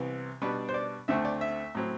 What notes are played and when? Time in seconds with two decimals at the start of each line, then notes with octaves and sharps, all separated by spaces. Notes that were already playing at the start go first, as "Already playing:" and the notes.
Already playing: C2 C3 E3 B3
0.42 B2 G3 B3 D4 B4
0.69 C5
0.74 D5
1.08 D2 D3 A3 C4 E5
1.25 D5
1.41 E5
1.75 A2 F#3 C4